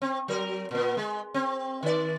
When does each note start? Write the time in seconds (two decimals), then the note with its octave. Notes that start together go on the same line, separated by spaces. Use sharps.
0.02 C4
0.28 F#3 A#4
0.71 A#2 B3
0.97 G#3
1.34 C4
1.83 D#3 D5